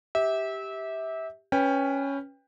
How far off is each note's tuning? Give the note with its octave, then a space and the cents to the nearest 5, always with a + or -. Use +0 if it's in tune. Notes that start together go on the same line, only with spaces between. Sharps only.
G4 +0 E5 -25
C#4 +0 B4 +0 G5 +25